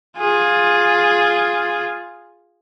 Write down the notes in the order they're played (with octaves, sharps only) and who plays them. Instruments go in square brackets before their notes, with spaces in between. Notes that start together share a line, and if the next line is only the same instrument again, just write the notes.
[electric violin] F4 G#4